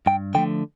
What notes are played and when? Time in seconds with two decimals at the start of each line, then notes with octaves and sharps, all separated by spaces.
0.06 G2 G5
0.35 D3 F3 A3 G5